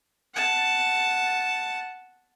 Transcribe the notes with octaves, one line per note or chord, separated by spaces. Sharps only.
F#5 A5